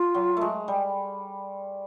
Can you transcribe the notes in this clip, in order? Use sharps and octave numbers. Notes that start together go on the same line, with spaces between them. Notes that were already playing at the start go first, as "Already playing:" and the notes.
Already playing: F4
F#3
G#3 A3
G3